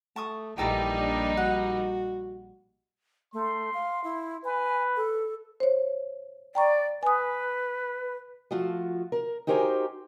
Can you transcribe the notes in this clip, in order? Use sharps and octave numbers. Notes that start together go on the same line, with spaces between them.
A3 A5 C#6 D#6
A#1 E3 G3 D#4 G4 A4 A#5
D4
F#4 F#5
A3 C6
F5
E4
B4 G#5
A4
C5 C#5
D5 G5 A#5 C#6
B4 G#5 D#6
F3 A3 F4 F#4
A#4
D#4 F#4 G4 A#4 C5 G#5